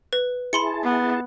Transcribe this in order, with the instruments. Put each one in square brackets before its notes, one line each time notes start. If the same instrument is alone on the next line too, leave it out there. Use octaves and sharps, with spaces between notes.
[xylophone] B4
[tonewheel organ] E4 G#4 A5 [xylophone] B5 C6 C#7
[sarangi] B3